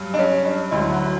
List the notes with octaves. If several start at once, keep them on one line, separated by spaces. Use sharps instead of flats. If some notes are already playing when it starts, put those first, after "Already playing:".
Already playing: G2 F#3
D4
C#4
D4
D2 D3 F#3 E4
F#4